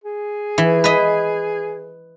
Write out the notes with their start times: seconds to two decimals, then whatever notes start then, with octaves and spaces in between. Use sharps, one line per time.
0.04 G#4
0.58 E3
0.84 B4 D#5